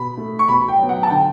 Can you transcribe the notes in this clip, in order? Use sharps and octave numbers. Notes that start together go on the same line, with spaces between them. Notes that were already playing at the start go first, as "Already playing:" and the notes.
Already playing: B2 B5
A3
C#6
B2 B5
G5
F#3 B3
F#5
A5
D3 G5